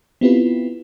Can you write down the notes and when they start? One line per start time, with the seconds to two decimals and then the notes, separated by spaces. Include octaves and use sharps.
0.21 B3 C4 E4 F4 G4 B4